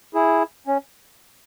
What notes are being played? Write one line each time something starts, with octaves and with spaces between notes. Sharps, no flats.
E4 G#4
C#4